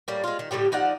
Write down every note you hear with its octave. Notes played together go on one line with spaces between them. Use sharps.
A2 G3 A#3
G#3 F4
D#3
A2 D3 G3 G4
F3 D#4 D5 F#5